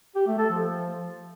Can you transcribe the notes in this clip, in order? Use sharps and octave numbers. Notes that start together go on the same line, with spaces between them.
G4
A3
A4
F3